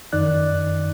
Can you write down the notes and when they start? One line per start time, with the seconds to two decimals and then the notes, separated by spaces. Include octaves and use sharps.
0.12 F#2 D#3 D#4 D5 F#6